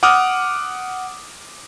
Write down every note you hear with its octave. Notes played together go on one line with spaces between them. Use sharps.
F#5 D6 D#6 F6